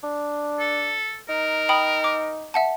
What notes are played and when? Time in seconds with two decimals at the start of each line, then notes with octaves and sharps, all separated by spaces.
0.03 D4
0.60 A4
1.29 D#4 A#4
1.69 G5 B5 D#6
2.04 D6
2.54 E5 F#5 A5